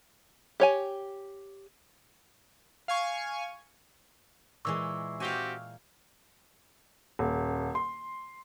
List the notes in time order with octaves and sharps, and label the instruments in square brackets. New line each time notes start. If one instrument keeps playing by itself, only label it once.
[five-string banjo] G4 C#5 G#5
[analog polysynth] F5 G#5 C#6
[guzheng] A#2 E3 G#3 [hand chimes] C#6 D6 E6
[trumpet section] C4 F#4 G4 [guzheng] F5 G5 G#5
[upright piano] D#1
C6